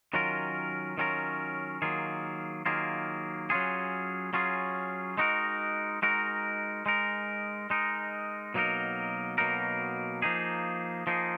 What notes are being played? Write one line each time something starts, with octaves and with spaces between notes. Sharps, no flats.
D#3 F#3 C#4 F4 A#4
D#3 F#3 C#4 F4 A#4
D#3 F#3 A#3 F4 G#4
D#3 F#3 A#3 F4 G#4
F#3 C#4 F4 G#4
F#3 C#4 F4 G#4
G#3 D#4 F#4 A#4
G#3 D#4 F#4 A#4
G#3 D#4 A#4
G#3 D#4 A#4
B2 F#3 A#3 D#4 A#4
B2 F#3 A#3 D#4 A#4
F3 A#3 D#4 G#4
F3 A#3 D#4 G#4